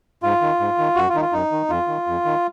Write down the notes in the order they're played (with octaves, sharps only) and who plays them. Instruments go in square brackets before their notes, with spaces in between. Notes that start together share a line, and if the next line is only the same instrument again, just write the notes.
[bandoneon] G#2 F4
D#3
G#2
D#3
F#2 F#4
F4
D#3 D#4
F4
F#2 D#4
D#3
F2 F4
D#3
F2
D#3